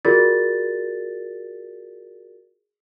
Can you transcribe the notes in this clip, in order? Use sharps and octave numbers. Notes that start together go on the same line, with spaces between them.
F4 F#4 G#4 A#4 D5 A6